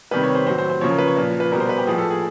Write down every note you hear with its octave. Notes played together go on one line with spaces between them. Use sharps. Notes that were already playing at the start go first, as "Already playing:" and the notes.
C3 D#3 G3 B4
C#5
C5
A2 F#3 C5
C5
C5
C#3 F3 C#5
A#4
B4
C#5
A#2 F3
B4
B2 G3 A#4
C5
B4
G4
A2 F3 G#4
A4
G#4